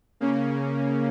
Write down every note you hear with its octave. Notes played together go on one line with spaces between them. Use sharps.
C#3 A#3 C#4